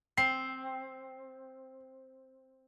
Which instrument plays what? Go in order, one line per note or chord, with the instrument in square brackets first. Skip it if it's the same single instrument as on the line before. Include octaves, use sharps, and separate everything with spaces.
[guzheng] C4 [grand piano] C7